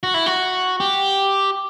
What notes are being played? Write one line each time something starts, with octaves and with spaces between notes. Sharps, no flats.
F#4
E4
F#4
G4